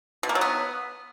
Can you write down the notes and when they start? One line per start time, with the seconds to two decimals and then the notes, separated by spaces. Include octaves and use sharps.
0.23 B2
0.29 A#3
0.35 F#3
0.41 B3